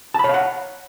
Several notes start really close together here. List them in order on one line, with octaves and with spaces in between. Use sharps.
A5 B5 C#5 F5 F#5